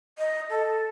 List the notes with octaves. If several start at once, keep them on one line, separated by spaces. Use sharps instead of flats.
D#5
A4